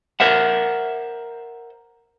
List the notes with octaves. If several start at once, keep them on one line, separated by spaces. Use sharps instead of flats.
A#4 C5 E5 F#5